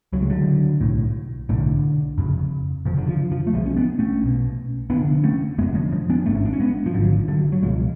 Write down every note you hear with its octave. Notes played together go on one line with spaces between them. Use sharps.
C#2 C#3 F#3
G#3
D3 F#3
B1 A2
B1 A2 D3
F1 F2 C#3
F1 F2 C#3 F3
D3
F3
F3
A3
B1 B2 F3 G#3
C#4
B3 D4
A3 C#4
B1 B2
F1 F2 D3 B3 D4
A3 C#4
F1 F2 D3 G#3 B3
F3 G#3
F3
B3 D4
G#1 G#2 A3 C#4
D4
C#4
G#3 B3
F3
G#1 G#2 D3 F#3
D3 F#3
F#3
C#2 B2 F3 G#3